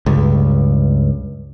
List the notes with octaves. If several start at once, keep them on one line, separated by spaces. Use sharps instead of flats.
C#2 G2